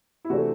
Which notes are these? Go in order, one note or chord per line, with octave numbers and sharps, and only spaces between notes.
E4
C3 E3 A3 D4 F#4